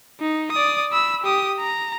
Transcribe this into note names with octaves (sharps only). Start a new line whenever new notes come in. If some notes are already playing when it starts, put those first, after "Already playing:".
D#4
D5 D#6
B5 E6
G4 D#6
A#5